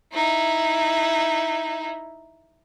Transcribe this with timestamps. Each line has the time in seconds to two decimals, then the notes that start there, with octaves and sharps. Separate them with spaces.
0.13 D#4 E4